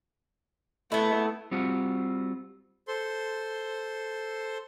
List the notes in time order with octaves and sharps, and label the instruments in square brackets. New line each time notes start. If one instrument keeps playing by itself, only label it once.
[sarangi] A3 [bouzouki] B3 E4
[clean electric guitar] G3 C4 F4 F#4
[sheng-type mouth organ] A4 C5 C6